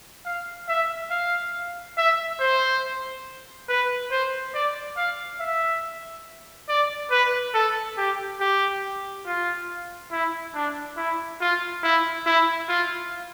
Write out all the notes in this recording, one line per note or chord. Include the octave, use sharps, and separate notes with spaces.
F5
E5
F5
E5
C5
B4
C5
D5
F5
E5
D5
B4
A4
G4
G4
F4
E4
D4
E4
F4
E4
E4
F4